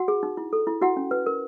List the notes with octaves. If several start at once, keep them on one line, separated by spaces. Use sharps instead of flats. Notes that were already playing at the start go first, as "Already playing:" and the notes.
Already playing: F#4 F#5
G#4
D#4
E4
A4
E4
E4 F#4 F#5
C#4
B4
A#4